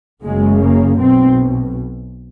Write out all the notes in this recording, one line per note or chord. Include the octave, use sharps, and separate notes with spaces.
F#1 F#2 C#3 G#3
A#3
B1 B2 C4